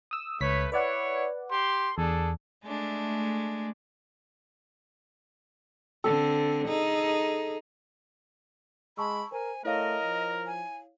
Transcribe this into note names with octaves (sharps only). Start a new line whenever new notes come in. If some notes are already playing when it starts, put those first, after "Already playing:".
D#6 E6
C#2 A3 B4 C#5 B6
E4 B4 C#5 D5 F#5
G4 C6
E2 D4 G#4 A4
G#3 A3 D4
D3 C4 A4
D#4 G#4
G#3 A5 B5 C#6 E6
A#4 C5 G#5
A3 E4 A#4 C#5 D#5 F5
F3
G#5